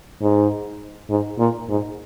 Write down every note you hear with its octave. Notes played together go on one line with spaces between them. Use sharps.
G#2
G#2
A#2
G#2